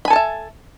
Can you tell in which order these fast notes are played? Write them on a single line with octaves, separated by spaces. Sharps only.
B5 G#5 A4 A5 E5